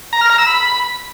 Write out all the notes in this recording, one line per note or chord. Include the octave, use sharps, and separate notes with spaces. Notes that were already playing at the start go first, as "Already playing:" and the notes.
A#5
F6
A#5
E6
B5